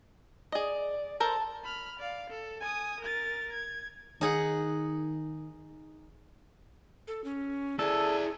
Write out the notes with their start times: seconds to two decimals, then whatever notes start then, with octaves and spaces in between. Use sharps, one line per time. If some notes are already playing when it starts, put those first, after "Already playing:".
0.52 G#4 D5 D#5
1.20 A4 A#4 C5 A5
1.64 B5 F6
1.99 D5 F5
2.30 A4
2.60 G#5 D#6
3.00 A#4 A6
3.53 G#6
4.21 D#3 D#4 G#4 F#5
7.08 A4
7.24 C#4
7.79 E4 G#4 A4 D5